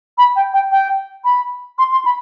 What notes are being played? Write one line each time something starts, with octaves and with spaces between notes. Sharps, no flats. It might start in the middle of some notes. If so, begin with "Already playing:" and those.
B5
G5
G5
G5
B5
C6
C6
B5